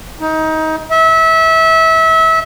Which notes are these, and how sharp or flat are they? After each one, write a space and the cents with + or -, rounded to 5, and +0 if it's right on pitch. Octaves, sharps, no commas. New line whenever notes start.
D#4 +25
E5 -25